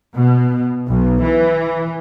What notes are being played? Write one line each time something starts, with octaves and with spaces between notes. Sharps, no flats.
B2
B1
E3